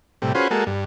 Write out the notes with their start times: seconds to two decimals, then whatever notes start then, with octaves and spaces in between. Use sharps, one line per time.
0.22 A2 C3 G3
0.35 C#4 F4 F#4 G#4 B4 C5
0.51 G#3 A#3 F#4 A4
0.67 G2